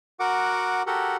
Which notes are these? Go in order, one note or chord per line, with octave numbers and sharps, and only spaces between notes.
F#4 A#4 F#5 D6
F#4 G4 A4 A#4 F#5